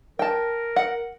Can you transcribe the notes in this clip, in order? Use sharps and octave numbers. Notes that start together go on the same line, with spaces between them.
A#4 G5 A5
F#5